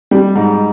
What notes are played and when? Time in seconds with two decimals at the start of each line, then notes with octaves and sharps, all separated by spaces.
0.11 G3
0.36 G#2